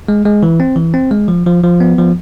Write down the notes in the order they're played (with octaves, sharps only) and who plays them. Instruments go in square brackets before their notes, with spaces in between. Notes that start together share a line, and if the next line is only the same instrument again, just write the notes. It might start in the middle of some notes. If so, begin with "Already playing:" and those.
[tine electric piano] G#3
G#3
E3
C4
E3
C4
G#3
F3
F3
F3
B3
F3